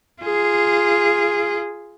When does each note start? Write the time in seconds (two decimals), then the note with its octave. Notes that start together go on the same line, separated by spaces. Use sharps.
0.22 F4 G#4